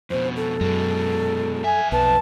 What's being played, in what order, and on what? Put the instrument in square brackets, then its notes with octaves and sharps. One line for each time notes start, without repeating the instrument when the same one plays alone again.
[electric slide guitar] F2 B2 [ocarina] C5
[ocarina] A4
[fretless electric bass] F#2 [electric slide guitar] B2 G#3
[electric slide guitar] F2 E5 [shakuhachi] G#5
[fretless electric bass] B1 [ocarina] B4 [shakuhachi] A5